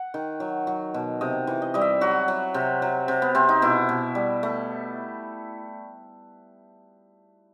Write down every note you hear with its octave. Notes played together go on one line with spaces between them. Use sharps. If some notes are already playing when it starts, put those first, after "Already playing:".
Already playing: F#5
D#3
F#3
F#3
B2
C3 D#5
E3
D#5
G3 D#5
E5
F#3 F#4
F#3
C3
F#3
C3
B3
C3 C4
D#4
B2 E4
B2
G3
A3